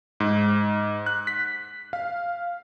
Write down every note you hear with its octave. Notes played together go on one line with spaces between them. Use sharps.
G#2
F#6
B6
F5